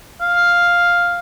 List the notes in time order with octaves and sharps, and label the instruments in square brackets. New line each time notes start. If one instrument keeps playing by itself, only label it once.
[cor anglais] F5